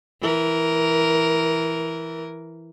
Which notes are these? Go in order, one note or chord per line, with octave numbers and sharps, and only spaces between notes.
E3 A#4